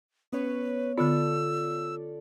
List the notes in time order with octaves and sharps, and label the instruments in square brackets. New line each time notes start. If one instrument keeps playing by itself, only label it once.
[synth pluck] B3 C#4 C#5 [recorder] B4
[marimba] D3 B3 [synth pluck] F4 A4 D5 [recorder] E6